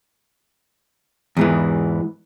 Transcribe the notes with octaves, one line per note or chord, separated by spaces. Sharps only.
E2 G#2 E3